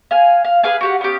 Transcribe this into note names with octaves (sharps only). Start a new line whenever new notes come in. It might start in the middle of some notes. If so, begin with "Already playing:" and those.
F5 G#5
F5
G#4 B4 F5 G#5
F#4 G4 F#5
B3 C#4 G4